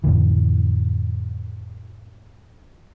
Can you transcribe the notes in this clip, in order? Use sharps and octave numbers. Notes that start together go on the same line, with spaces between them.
F2 A2 D3 E3